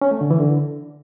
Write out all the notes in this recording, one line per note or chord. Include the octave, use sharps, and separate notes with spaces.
C#4
A3
D3
E3
D3